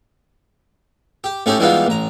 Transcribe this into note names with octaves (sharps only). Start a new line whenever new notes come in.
G4
A2 A3 C#4 D#4 G4
E3 G3 G#3 B3 D#4 F4
A1 A#5